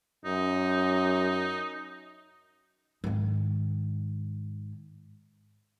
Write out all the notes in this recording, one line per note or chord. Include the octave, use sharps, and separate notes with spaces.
F#2 D#4
G#2 D#3